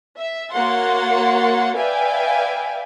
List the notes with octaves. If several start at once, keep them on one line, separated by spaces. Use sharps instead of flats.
E5
A#3 F#4 C#5 F#5 C6 A6
B4 D5 E5 F5 G5 G#5